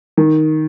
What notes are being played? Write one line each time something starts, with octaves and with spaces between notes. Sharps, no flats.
D#3